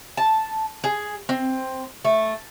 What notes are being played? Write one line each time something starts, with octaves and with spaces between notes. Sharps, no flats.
A5
G#4
C4
A3